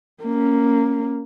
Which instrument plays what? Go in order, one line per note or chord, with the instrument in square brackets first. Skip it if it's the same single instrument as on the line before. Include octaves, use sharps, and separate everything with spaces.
[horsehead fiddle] A#3 C#4